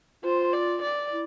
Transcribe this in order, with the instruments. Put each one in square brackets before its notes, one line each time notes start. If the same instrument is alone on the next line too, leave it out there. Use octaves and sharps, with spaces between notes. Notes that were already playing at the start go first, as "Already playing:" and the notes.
[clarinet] F4 [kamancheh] C5
[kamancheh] D5
D5
[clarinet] E4